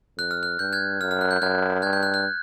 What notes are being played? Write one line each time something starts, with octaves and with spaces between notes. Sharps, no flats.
F2 F#6
F6
F#6
G2 G6
F#6 G#6
F#2 F6
F6
F#6
G6
F#2 F#6 G#6
G2 F#6 G#6
G6
F#6
F#6